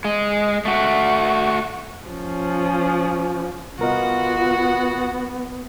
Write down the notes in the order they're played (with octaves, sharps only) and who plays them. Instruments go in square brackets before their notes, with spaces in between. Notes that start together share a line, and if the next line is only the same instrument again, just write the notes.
[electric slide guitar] G#3
A3 F#4
[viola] F3 C#4
[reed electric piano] C2 A#4 D#5 [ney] B3 [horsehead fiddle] F4 [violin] F#4